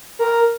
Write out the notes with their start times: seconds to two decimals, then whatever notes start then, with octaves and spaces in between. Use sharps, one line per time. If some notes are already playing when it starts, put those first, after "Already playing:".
0.19 A#4